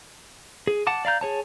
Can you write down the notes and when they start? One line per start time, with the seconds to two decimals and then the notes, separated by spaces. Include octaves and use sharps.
0.67 G#4
0.87 F#5 A5 D6
1.05 D5 F5 A#5 G6
1.21 G#4 C#5 A5